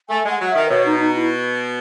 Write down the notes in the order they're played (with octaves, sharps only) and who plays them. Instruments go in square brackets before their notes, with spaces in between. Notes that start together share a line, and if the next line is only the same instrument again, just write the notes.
[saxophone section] A3 [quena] G#5
[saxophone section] G#3
[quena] F#5
[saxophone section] F#3
[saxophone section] D#3 [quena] E5
[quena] B4
[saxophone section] B2 [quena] C#5
[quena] D#4
D#4
E4